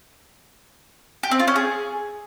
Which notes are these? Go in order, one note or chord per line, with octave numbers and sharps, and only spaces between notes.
G4
C4
F4
C#4
G#4